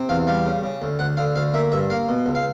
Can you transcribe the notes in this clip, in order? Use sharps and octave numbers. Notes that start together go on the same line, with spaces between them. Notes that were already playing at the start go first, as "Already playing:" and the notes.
Already playing: C3
E2 F5
G3 F5
C#3
C#3
D2
D2 F#5
D3 F5
D2 F5
A#3 E5
G2 E5
A#3 F5
B2
C#2
F5